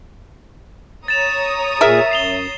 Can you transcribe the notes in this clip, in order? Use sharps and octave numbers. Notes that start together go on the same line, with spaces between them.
C#5 A#5 D#6 A6 E7 F7
A#2 G#4 A#4 E5
F#2 C7 F7 G7